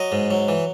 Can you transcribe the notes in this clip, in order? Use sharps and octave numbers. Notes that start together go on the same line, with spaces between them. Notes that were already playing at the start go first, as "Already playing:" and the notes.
Already playing: F#3 D#5
G#2
F#3
E3